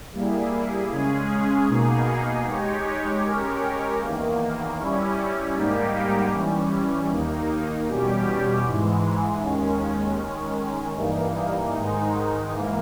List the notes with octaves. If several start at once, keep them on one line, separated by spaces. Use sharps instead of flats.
G3 A#3 E4 G#4
C#3 G#3 C#4 G#4
B2 A#3 D#4 G#4
G#3 D#4 G4 C#5
G#3 C#4 G4 A#4 C#5
E2 D#3 A#3
G3 C#4 E4
G#2 G3 A#3 D#4 G4
E3 G3 C#4
D#2 D#3 A#3 D#4
E2 B2 G3 C#4 G4
G#2 E3 G#3
D#2 D#3 G#3 C#4
D#3 G#3 C#4
G2 E3 A#3 D#4
G#2 D#3 G#3 D#4
G#2 E3 A#3